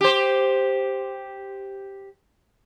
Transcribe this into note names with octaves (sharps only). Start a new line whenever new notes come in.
G4 C5